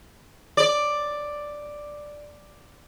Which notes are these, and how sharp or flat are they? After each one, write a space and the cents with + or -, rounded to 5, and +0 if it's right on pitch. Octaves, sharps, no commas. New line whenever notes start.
D5 +5